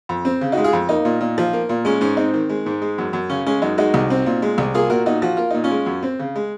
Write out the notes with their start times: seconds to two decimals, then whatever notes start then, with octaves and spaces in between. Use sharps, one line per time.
0.09 F2
0.25 C4
0.41 C#3
0.52 D#4 F#4
0.57 G#3
0.64 F4 G#4
0.73 F2
0.89 A#3 D#4
1.05 A#2
1.21 A#2
1.38 F3
1.53 A#3
1.69 A#2
1.85 G#3 C#4
2.01 G#2 C#4
2.17 C4 D#4
2.34 D#3
2.49 G#3
2.66 G#2
2.82 G#3
2.98 F#2
3.13 F#2
3.30 C#3 C#4
3.46 G#3 C#4
3.62 F#2 D#4
3.78 G#3 D#4 F#4
3.94 C2
4.10 C4
4.26 A#2
4.42 G#3
4.58 C2
4.74 A#3 F4 G#4
4.90 A#2 F#4 A#4
5.06 A#2 D#4 F#4
5.22 F3 F#4
5.37 A#3 F4
5.51 A#2 D#4
5.64 C#4 F4
5.71 G#3
5.86 F#2
6.03 C4
6.19 C#3
6.36 G#3